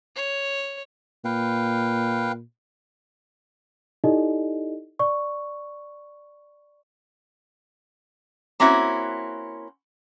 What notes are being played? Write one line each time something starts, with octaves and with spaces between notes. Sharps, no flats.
C#5
A#2 B4 F5 G5
D#4 E4 G4 A4 D5 D#5
D5 C#6
A#3 C4 C#4 E4 F#4